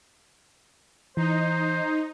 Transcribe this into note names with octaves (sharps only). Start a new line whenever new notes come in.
E3 D#4 C5